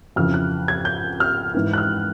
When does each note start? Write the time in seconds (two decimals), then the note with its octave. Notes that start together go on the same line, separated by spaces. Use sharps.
0.16 F2 C#3 E3 F6
0.34 F#6
0.68 G#6
0.85 G6
1.20 F6
1.55 G#2 E3
1.73 F#6
1.78 F6